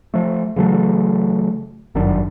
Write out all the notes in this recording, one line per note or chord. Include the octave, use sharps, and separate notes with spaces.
F3 A3
C#3 E3 F#3 A3
G1 F#2 D#3 D4